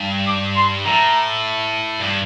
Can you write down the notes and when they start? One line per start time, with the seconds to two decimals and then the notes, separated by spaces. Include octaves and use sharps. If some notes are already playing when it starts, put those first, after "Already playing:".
Already playing: G2
0.27 D6
0.56 C6
0.85 A2 A#5
2.00 G2